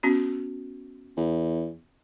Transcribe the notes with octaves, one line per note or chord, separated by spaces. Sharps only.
B3 C#4 F#4
E2